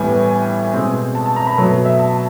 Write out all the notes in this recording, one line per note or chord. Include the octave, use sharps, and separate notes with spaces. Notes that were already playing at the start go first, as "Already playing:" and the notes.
Already playing: A2 E3 G3 B3 G#5
G#5
B2 G#3 C4
A5
A5
A#5
B5
B2 F#3 A3
E5
A5